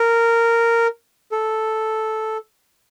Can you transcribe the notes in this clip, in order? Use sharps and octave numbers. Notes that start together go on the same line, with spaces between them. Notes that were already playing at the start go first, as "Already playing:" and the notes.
Already playing: A#4
A4